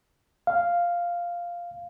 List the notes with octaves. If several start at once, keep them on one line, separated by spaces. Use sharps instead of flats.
F5